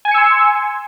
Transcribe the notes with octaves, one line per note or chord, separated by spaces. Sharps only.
G#5 C6 E6 G#6 C#7